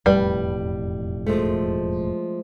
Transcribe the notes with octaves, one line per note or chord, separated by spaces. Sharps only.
E1 F2 A2 G3 B4
F3 G#3 A3